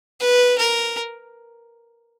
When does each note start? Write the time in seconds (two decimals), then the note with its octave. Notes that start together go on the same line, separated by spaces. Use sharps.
0.20 B4
0.58 A#4